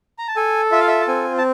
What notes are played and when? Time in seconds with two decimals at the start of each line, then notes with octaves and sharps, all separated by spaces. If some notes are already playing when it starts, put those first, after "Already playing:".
0.19 A#5
0.28 A5
0.36 A4 G#5
0.72 F4 E5
0.80 F5
0.88 E5
1.01 A5
1.08 C4 G#5
1.38 A5